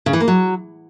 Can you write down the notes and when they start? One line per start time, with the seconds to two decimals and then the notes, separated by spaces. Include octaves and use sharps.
0.06 C#3
0.13 E3
0.20 A#3
0.28 F#3